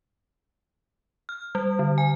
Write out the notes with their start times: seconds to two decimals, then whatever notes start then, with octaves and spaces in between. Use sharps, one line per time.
1.29 F6
1.55 G3
1.79 D3
1.98 G#5